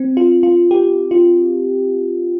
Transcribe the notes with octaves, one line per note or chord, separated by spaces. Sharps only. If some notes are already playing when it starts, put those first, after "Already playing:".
Already playing: C4
F4
F4
G4
F4